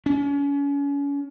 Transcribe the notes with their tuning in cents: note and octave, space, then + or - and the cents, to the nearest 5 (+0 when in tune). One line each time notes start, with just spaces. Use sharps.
C#4 +35